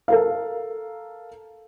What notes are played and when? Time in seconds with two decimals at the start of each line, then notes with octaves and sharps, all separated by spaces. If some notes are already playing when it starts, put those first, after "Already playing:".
0.08 A4 A#4 F5